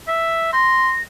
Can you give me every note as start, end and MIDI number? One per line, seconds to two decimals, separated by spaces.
0.08 0.51 76
0.53 0.92 84
0.53 1.02 94